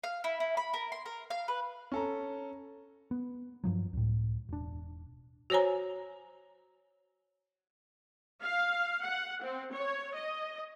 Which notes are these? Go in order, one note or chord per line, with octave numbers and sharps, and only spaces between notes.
F5
E4
E4
B5
A#4
C6
A#4
F5
B4
C#4 A4 A#5
B3
G2 F3 F#3
C#2 A2
E1 D4
F#4 C5 C#5 G#5 A#5
F5
F#5
C4
C#5
D#5